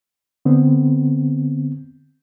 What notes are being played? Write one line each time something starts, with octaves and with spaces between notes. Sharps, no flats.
D3 B3 C4